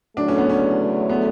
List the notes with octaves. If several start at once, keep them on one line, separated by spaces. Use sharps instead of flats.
E2 D3 F#3 A3 D4
C#4
B3
C#4
B3